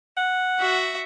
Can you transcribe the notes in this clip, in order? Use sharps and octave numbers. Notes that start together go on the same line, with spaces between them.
F#5
F#4 E5